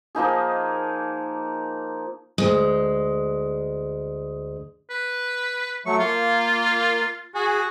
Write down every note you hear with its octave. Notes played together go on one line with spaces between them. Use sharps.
F3 A#3 D#4 G#4
D2 G#3
B4
F#3 A3 C#6
A#3 F4
F#4 G#4